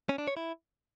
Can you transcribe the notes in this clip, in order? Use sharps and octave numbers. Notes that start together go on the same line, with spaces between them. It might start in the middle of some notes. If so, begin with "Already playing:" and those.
C#4
D4
C#5
E4